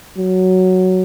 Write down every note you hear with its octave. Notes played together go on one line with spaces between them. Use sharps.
F#3